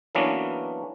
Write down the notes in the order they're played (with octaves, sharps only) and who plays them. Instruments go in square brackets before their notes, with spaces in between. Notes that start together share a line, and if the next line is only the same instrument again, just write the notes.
[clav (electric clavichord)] E3 F#3 A#3 B3 C#4 D4